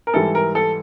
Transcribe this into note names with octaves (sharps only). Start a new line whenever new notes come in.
A#4
G#2 E3 G3 A4
A#4
A4